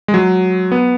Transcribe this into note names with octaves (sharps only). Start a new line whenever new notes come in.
G#3
F#3
B3